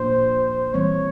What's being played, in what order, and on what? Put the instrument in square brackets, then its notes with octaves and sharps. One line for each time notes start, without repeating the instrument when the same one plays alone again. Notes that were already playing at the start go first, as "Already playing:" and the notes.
Already playing: [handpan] A#2 F3 A#3 D4 F4 [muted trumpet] C5
[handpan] E3 G3 C4 [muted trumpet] C#5